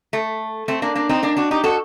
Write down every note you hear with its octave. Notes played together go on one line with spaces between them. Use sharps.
A3
A3 C4
A#3 D4
A#3 D4
C4 D#4
A#3 D4
D4 F#4
D#4 G4
F#4 A4